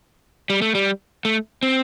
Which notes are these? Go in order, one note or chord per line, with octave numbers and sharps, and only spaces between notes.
G3
A3
G3
A3
C4